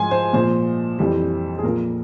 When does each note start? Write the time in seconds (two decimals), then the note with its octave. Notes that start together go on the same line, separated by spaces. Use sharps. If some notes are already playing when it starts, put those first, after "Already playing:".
Already playing: G#2 F3 G#5 C6
0.11 C5
0.33 A#2 F3 C5
0.99 F2 E3 G3
1.59 G#4
1.63 A#2 F3 A#4